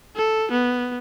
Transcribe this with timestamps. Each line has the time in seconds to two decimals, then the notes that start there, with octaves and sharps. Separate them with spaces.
0.16 A4
0.51 B3